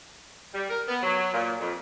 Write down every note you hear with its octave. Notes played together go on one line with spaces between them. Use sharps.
G3
A#4
B3
F#3
A#2
F2